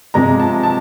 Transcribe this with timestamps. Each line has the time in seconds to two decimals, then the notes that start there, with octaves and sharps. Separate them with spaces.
0.14 C3 F3 G#3 A#5
0.40 A5
0.63 A5